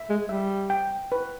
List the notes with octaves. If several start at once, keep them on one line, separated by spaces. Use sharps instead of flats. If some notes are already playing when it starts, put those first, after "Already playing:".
Already playing: E5
G#3
G3 E5
G5
B4